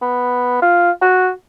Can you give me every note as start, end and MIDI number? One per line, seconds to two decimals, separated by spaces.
0.02 0.60 59
0.62 0.91 65
1.01 1.30 66